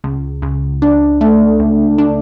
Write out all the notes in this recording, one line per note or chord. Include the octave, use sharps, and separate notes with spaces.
C#2
C#2
D4
A3
C#2
D4